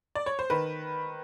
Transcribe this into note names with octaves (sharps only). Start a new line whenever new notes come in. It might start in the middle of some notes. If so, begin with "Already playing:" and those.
D5
C#5
C5
D#3 B4